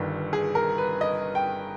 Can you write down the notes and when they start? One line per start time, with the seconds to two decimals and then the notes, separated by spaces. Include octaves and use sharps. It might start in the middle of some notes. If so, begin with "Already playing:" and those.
Already playing: G1 G2 D#3
0.33 G#4
0.55 A#4
0.78 B4
1.01 D#5
1.35 G5